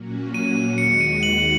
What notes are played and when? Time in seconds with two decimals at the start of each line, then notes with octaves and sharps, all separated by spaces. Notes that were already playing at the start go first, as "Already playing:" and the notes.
Already playing: A#2 F#3 A#3 C#4 F#4
0.34 D#7
0.78 D#2 D#3 G#3 F#4 C#7
1.01 D#7
1.23 F#7